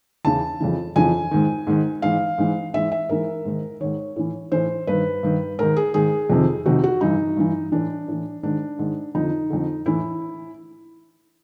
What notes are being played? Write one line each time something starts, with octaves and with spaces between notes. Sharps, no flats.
E2 C#3 E3 A5
F2 C#3 E3
F2 C#3 E3 G#5
G#2 D#3
G#2 D#3
G#2 E3 F5
G#2 E3
G#2 E3 E5
E5
G#2 E3 A#4
G#2 D#3
G#2 D#3 C#5
A2 E3
A2 E3 C5
G2 D#3 B4
G2 D#3
G#2 D#3 A#4
G#4
G#2 D#3 G#4
F2 C3 D#3
F2 C3 D#3 F#4
F#4
G2 E3 D#4
G2 E3
A2 E3 D4
A2 E3
G#2 D#3 D4
G#2 D#3
F2 D3 D#4
F2 D3
A2 E3 E4